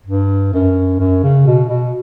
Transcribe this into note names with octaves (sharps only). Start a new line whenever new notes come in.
G2
F#2
F#2
C#3
B2
B2